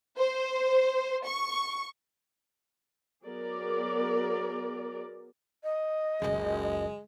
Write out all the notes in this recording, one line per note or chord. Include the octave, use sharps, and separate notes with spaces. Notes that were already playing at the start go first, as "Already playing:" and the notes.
C5
C#6
F#3 B3 G#4 A#4 D5
D#5
F#1 C#2 G#3